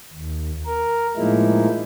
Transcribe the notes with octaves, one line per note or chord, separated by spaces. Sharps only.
D#2
A#4
A2 F3 G#3 A#3 D#4 E4